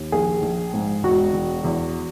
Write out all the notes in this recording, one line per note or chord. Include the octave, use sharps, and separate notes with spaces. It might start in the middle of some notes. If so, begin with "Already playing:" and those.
Already playing: D#2
A#1 G#4
A#1
G#2
E1 F#4
E1
E2